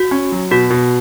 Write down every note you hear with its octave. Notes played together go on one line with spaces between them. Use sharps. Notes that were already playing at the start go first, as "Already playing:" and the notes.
Already playing: F#4
C#4
F#3
B2 F#4
B2